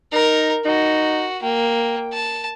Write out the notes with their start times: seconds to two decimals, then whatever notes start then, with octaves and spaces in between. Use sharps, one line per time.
0.13 D#4 A#4
0.65 D#4 F#4
1.43 A#3 G5
2.13 A5